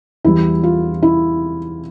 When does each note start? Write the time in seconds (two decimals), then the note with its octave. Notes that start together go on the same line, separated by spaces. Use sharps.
0.24 E2 E3 G3 E4
0.63 F4
1.03 E4